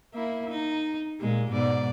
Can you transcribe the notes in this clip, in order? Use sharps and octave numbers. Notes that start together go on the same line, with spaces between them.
A#3 E4
D#4
A#2 G#3
G#2 B2 D5